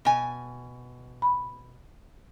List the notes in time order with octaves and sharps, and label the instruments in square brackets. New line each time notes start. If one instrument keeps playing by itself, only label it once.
[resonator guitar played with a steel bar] B2 G#5
[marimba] B5